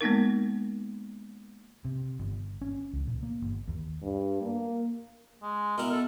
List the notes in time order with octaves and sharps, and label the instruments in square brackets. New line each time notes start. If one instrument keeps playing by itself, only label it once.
[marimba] G#3 A#3 B3 D#4 A#4
[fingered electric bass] C3
G1
C#4
C#2
A#2
A#3
G1
D#2
[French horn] G2
A#3
[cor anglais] G#3
[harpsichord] B2 E4 [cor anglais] A#4
[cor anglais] A4